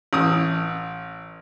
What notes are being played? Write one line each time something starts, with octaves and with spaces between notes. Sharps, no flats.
A1 D#6